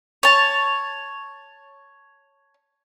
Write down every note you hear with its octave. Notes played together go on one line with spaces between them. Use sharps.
C#5 A5